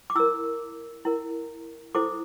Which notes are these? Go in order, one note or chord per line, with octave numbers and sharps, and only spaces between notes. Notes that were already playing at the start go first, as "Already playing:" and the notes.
D6
E4 A#4 E6
E4 A#4
E4 A4 C5 D6